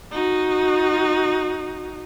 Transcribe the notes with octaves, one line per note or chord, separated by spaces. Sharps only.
D#4 F#4